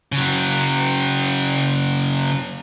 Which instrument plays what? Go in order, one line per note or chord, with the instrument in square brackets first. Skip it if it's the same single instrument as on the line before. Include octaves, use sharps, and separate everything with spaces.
[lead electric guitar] C#3 F#3